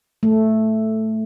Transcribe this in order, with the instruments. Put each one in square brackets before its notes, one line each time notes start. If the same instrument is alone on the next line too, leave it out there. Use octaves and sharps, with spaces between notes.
[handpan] A3